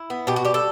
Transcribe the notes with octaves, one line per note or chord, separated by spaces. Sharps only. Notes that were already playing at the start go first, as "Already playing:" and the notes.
Already playing: E4
B3
B2 G4
F#4
G3 G4
A4